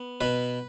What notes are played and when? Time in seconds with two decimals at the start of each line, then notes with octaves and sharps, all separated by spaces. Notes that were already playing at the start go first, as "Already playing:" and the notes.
Already playing: B3
0.21 B2 B4